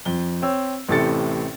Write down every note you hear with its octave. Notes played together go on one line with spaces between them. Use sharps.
F2 G7
C4 C#5 E6
A1 A2 C3 A4 A6 C#7